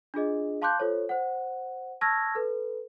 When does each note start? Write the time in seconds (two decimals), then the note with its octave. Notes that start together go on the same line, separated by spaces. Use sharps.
0.14 D4 F4 G#4 D#5
0.62 F5 A5 C6 D6 F#6 G6
0.79 F4 A4 C5 C#5
1.09 C5 F#5
2.01 A5 C#6 E6 F6 G#6 A#6
2.35 A4 B4